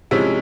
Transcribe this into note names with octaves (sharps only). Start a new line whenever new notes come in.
C3 F3 G#3 C#4 E4